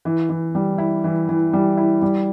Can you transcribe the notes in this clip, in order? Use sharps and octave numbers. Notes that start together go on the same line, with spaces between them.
E3
E3
G3
E4
E3
E3
G3
E4
G3